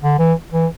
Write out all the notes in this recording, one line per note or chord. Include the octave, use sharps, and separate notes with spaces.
D3
E3
E3